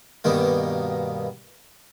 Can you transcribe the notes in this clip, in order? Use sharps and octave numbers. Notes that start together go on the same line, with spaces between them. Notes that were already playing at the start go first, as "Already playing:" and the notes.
G2 B2 D#3 A#3